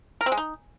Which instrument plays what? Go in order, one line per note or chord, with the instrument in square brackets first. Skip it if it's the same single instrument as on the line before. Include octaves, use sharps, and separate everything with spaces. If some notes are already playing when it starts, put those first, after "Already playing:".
[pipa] A#4
C4
G#3
D#4